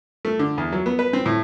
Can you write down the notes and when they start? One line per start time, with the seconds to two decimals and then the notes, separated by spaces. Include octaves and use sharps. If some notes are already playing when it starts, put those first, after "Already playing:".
0.25 A3
0.39 D3
0.58 E2
0.72 F#3
0.86 B3
0.99 B4
1.13 C4
1.26 A2